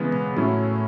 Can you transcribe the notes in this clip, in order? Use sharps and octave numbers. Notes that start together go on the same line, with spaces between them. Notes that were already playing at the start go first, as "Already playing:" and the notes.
Already playing: C#3 E3 G#3 B3
B2
A2 F#3 C#4 E4